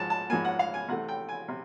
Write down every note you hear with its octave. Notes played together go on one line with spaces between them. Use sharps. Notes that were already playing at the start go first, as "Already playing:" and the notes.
Already playing: G#2 F3 A5
A5
G#2 F3 A#3 G#5
F#5
F5
G#5
C3 E3 A3 F#5
G5
G#5
C3